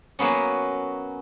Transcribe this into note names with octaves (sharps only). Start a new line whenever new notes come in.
F#3 A#3 B3 C#4